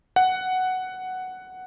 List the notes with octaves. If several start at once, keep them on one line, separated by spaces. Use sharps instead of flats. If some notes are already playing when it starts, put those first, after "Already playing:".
F#5